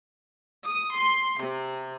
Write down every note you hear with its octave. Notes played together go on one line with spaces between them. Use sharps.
D#6
C6
C3